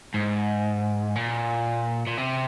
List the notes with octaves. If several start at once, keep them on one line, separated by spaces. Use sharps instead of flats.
G#2
A#2
A#2
C3